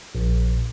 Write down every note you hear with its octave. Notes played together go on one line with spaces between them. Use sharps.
A#1